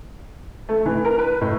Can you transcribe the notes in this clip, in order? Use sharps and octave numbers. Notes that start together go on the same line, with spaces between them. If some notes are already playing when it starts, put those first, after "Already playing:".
A3
E3
A#4
B4
A2